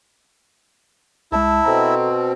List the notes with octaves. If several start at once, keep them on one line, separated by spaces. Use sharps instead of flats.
C2 G#3 E4 A5 E6
B2 C4 A4 A#5